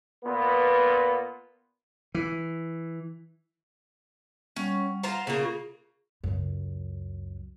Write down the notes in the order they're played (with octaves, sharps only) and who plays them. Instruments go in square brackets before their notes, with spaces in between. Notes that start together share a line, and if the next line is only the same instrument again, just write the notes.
[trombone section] A#2 B3
[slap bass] E3
[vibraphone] G3 F#5 C#6 [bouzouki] C#4
[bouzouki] F4 C5 A#5 [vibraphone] F#5
[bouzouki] C#3 A#3 [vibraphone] F4
[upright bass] C#2 F#2